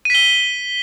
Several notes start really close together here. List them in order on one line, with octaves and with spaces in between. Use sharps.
D#7 B6 G7